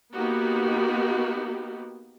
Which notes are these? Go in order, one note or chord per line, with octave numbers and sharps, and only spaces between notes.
A#3 B3 D#4 F#4 G4